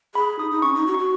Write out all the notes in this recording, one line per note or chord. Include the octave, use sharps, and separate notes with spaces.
G#4 B5
D#4 D#6
D#4
C#4 C#6
D#4
F#4
C#6
F#4